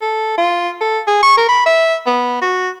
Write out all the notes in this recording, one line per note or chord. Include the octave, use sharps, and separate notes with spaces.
A4
F4
A4
G#4
C#6
A#4
B5
E5
B3
F#4